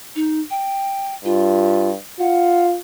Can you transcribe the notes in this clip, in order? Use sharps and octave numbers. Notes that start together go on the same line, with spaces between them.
D#4
G5
G2 F4
F4 F#5